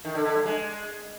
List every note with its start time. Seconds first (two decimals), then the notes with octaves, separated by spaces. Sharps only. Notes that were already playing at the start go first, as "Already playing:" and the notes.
0.05 D#3
0.15 D3
0.25 D3
0.35 G2
0.45 G#3